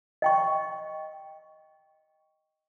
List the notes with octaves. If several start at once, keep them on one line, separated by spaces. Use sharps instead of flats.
D#5 G5 C#6